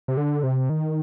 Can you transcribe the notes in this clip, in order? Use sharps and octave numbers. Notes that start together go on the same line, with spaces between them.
C3
D3
C3
D#3